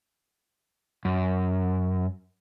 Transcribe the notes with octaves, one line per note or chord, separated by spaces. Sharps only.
F#2